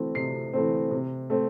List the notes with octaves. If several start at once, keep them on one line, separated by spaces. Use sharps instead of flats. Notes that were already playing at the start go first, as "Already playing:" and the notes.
Already playing: E3 A3 C4
C3 C7
E3 A3 C4
C3
A3 C4